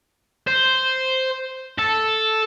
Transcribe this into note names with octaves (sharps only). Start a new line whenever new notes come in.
C5
A4